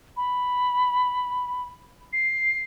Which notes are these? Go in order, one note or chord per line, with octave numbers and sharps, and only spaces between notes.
B5
C7